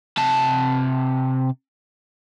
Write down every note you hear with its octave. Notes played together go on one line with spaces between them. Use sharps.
C3 A5